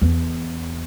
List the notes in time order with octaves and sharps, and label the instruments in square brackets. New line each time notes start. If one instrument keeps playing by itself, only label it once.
[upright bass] E2